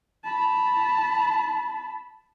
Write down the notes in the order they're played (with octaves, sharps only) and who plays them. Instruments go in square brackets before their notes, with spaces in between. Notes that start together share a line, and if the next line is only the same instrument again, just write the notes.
[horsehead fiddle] A5 B5